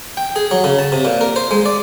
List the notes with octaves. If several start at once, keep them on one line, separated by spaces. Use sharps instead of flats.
G5
G#4
F#3
C#3
A5
C3
A#2
A#4
C5
G#3
D5